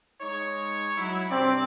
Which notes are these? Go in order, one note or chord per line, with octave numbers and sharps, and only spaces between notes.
G#3 D#4 C#5
F#3 E4
G2 C3 C4 D5